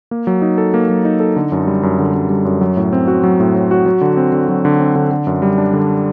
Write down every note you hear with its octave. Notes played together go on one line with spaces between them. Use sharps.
A#3
F#3
D#4
A4
A#3
F#3
D#4
A4
D3
F#2
G3
F#2
D3
F#2
G3
F#2
F#3
A2
C4
F#4
F#3
A2
C4
F#4
F#3
D3
C4
D3
F#3
D3
C4
D3
D3
F#2
G3
D4
D3